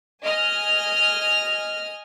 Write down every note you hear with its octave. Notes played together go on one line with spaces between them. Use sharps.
D#5 G#5 F6